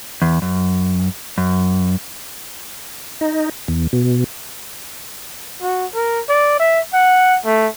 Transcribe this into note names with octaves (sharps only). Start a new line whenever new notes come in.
E2
F#2
F#2
D#4
E2
B2
F#4
A#4
D5
E5
F#5
A3